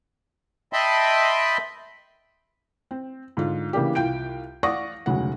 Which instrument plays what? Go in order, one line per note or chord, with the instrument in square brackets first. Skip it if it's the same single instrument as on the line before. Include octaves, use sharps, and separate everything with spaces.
[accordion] D#5 E5 G5 A5 B5 C6
[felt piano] C4
G#2 D3 F4
C#3 E3 A#3 D4 G4
C2 F4 G5 G6 D7
D5 F5 F#5 C#6 D#6 A#6
F1 D2 C#3 F#3 G#3 F#5